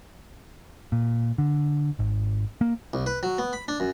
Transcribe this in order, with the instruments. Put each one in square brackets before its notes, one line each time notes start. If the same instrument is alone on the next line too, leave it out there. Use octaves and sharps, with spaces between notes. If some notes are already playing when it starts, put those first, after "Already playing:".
[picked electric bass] A#2
D3
G#1
A#3
[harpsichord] C2
B4
F#3
B3
B5
D4
F#2